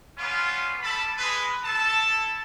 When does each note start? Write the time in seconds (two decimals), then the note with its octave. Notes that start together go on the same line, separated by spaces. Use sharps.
0.18 G3 B3 C#4 F4
0.82 G3 A4 A5 B5
1.17 G#3 B4
1.64 E4 A4 A5